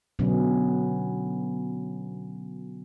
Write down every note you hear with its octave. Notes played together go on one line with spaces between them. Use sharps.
B2 D3 F#3 B3 C#4